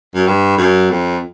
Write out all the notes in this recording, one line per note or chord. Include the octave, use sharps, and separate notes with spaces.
F#2
G2
F#2
F2